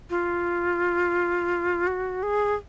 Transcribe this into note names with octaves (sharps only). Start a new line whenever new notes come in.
F4
F#4
G#4